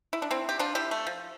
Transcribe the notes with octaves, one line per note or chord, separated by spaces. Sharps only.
E4
D4
C4 E4
G4
D4 F4
E4 G4
A3
F3